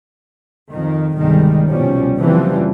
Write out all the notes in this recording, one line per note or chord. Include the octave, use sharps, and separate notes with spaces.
F2 D#3
G1 C2 D#3 G3 G#3
C2 B2 F3 G3 C#4
F#1 F#2 E3 F3 G3 C4